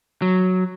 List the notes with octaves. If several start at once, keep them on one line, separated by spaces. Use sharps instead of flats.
F#3